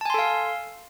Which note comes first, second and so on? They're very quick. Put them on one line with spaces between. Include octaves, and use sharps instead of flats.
A5 G#5 C6 A4 F5